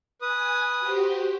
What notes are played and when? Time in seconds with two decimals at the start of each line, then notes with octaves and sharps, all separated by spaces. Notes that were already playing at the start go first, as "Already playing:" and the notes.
0.22 B4 G#5 D#6
0.80 F#4 G4 C5